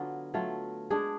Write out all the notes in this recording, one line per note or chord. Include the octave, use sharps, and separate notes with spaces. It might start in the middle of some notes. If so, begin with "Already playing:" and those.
Already playing: D3 F#3 B3 F4
F#3 A3 F4
G#3 D4 G#4